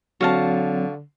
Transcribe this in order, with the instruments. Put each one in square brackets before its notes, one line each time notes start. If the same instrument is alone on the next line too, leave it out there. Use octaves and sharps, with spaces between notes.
[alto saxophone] D3 [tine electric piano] F#3 C4 [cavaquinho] F#4 F5 A5